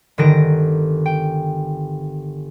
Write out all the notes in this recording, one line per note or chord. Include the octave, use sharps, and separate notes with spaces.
G1 D3 D#3 A#6 D7
G5